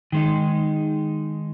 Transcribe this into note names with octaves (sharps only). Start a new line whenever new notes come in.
D#3 G#3 D#4